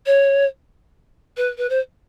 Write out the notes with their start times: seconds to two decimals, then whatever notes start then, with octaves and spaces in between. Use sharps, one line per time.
0.06 C#5
1.37 B4
1.58 B4
1.69 C5